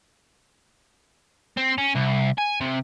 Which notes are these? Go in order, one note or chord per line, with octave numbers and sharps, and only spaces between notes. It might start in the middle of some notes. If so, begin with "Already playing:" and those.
C4
C#4
C2
G#5
C3